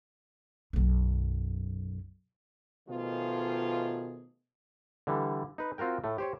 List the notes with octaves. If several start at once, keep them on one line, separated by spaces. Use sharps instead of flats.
B1 F#2
B2 D#3 F3 A3 F4 G#4
D3 E3 G3
D#4 B4
C4 F4 F#4 A#4 G5
A2 A3
G4 C5 C#5